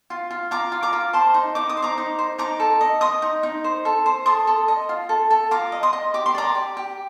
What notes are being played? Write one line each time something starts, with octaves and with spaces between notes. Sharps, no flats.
F4
F4
F4 A#5 D6
F4
A#5 D6
F4
C5 A5 C6
D#4
D#4 D6
D#6
C5
A#5 D6
D#4
C5
D#4 A#5 D6
A4
D#5
D#5 C6 D#6
D#4
D#4
C5
A4
C5
A4 C6 D#6
A4
D#5
F4
A4
A4
F4 A#5 D6
D#5
C6 D#6
D#5
G4 D6
C6
D5 A#5 D6
G4
G4